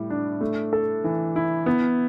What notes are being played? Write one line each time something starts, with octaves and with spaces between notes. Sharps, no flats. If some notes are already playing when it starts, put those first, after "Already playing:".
Already playing: A2 G3
D4
A3
A4
E3
E4
B3